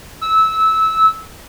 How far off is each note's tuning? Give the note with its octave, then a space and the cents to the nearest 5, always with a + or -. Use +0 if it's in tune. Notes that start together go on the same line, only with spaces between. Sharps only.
E6 -20